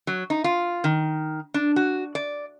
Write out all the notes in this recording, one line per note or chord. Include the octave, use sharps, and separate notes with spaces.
F#3
D#4
F4
D#3
D4
F#4
D5